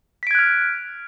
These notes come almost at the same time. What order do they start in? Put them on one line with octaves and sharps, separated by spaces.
B6 D7 G#6 F#6 F6